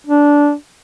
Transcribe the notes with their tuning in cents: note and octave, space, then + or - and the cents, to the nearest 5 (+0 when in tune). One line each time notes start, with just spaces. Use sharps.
D4 -15